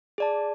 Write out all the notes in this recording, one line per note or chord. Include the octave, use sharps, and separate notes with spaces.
G#4 D5 A5